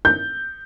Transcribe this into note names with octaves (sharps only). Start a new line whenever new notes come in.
G6